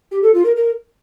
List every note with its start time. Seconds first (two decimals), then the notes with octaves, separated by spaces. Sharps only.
0.12 G4
0.23 A4
0.34 F4
0.45 A#4
0.56 A#4